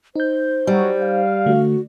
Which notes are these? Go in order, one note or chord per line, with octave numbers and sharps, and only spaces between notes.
D#4 C5 G6
F#3 G3
F5
D3 A3 F#4